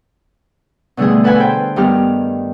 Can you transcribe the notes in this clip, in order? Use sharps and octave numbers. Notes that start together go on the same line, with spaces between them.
B2 D3 G3 A3 G#4
A4 B4 F#5 G#5 A5 B5
C5 G5
G2 D#3 G3 B3 G4 F6